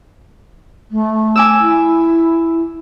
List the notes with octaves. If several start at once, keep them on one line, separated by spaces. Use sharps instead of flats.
A3
G#5 D6 E6
E4